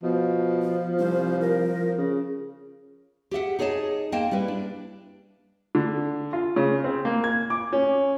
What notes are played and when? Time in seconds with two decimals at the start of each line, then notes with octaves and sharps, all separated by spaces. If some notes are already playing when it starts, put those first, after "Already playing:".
0.03 B2 F3
0.62 F4
0.99 C2 C5
1.41 A#4
1.98 C#3
3.31 G4 G#4 E5 F#5
3.59 D#4 G#4 C#5 D#5 A5
4.12 A#3 C4 D#5 G5 A5
4.31 G3 E4 B4
4.48 D4
5.75 D3
6.33 F4
6.56 C#3
6.84 C4
7.05 A#3
7.24 G#6
7.50 D6
7.73 C#4